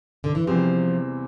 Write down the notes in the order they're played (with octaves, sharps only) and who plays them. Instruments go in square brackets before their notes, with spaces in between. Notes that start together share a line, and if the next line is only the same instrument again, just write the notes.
[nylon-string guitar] D3
E3
[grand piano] E2 C3 G3 C4 [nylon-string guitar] F3